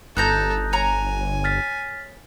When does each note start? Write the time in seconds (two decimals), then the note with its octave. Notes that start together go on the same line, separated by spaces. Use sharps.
0.17 G1 D#4 A4 A#5 F#6 G6 A#6
0.73 C#5 G#5 A#5
1.44 F6 A6 B6